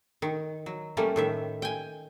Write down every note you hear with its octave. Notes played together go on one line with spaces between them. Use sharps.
D#3
F#3
G3 A3 A#3 C#4
A2 D#3 E5
G5 G#5